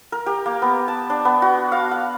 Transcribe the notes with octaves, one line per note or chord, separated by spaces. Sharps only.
A#4
G4
A#3
B3
A5
D4
B3
F#4
F5
F#5